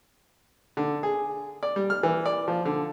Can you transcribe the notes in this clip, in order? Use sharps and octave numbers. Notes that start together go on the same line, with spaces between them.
D3
G#4
D5
G3
F6
E3
D5
F3
D3